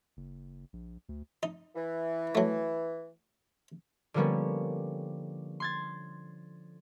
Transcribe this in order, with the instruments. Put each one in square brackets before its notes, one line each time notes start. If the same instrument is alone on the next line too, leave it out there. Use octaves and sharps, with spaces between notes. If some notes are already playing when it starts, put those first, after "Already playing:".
[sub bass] F#1
A#1
D2
[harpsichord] D#4
[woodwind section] E3
[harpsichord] F#3 A3
[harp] D3 F3 G3 A#3 B3 C#4
C6 G#6 A6